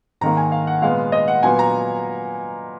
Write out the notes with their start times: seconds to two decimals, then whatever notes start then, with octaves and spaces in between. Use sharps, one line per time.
0.21 G#2 D#3 A#3 A#5
0.37 G#5
0.52 F5
0.67 F#5
0.82 A#2 G#3 B3 F5
1.12 D#5
1.28 F#5
1.43 A#2 F#3 B3 G#5
1.59 A#5